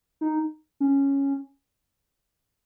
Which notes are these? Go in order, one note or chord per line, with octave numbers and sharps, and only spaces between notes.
D#4
C#4